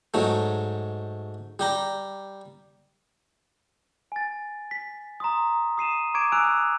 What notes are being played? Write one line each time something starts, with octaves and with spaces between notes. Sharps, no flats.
G#2 F#3 A3
G3 G4 A#5
G#5 A6
B6
A#5 C6 D#6
D#6 C7 D#7 E7
A#5 C#6 D6 G#6 D7 E7
G#5 D#6 E6 F#6 D7 F7